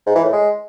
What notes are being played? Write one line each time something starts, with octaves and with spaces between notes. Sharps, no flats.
G#2
E3
A2
G#3